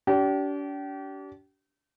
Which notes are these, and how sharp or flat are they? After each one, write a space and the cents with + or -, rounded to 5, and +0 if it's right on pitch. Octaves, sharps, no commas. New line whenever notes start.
D4 -40 G4 -35